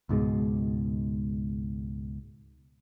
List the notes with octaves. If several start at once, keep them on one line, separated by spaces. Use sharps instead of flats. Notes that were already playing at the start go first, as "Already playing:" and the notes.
C#2 G#2 B2 G#3